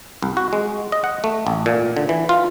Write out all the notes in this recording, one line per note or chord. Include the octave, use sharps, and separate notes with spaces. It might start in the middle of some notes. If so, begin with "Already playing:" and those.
C2
F#4
G#3
D#5
F#5
A3
A1
A#2
D3
E3
F4